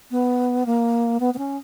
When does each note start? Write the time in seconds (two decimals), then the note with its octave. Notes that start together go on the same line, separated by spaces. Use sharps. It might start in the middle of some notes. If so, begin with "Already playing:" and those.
0.11 B3
0.66 A#3
1.20 B3
1.34 B3
1.38 C#4